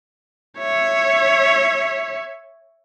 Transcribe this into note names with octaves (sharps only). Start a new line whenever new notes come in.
C#5 E5